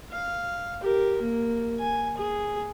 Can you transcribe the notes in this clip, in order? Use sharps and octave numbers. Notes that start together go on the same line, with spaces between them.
F5
G4 A#4
A#3
G#5
G#4